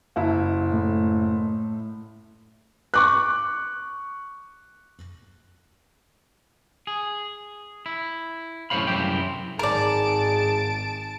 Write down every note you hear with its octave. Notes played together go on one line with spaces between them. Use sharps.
F#1 E4
A2
C#6 D6 F#6
G#4
E4
F#2 A2 C5 C#5 F5 B5
C2 F#2 C4 E4 G4 G5
G#1 G#4 A#4 D5 A5 D7